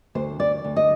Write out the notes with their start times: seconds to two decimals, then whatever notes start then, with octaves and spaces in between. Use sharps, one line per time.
0.15 D2 C5
0.40 D2 D5
0.64 D2
0.76 D#5